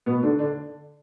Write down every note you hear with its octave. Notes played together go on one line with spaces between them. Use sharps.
B2 B3
D3 D4
D3 D4